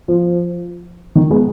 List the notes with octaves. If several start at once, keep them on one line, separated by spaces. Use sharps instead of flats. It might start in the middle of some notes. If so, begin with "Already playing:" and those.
F3
D#3
G#3 B3